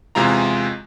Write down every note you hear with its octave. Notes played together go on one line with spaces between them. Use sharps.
E2 C3 G#3 F4 A#5